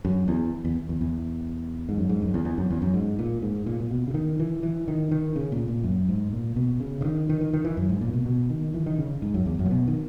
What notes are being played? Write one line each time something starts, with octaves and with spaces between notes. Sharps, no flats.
F#2
E2
E2
E2
E2
G#2
F#2
G#2
F#2
E2
E2
F#2
E2
F#2
G#2
A#2
G#2
A#2
A#2
B2
C#3
D#3
E3
E3
D#3
D#3
C#3
A#2
A#2
F#2
G#2
A#2
B2
C#3
C#3
D#3
D#3
D#3
D#3
E3
F#2
G#2
A#2
B2
B2
D#3
E3
D#3
C#3
G#2
F#2
E2
F#2
A#2
B2
D#3